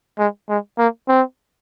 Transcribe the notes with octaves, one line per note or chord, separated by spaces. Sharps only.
G#3
G#3
A#3
C4